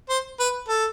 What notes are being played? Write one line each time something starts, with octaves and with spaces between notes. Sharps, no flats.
C5
B4
A4